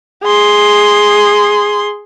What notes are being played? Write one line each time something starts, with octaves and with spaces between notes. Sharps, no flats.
G#4 C6